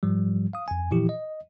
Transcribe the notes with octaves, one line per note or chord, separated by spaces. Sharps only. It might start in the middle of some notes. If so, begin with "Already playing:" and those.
G#2 F3 G3
F5 D#6
F2 G#5
A#2 E3 F3 E4 G4
D#5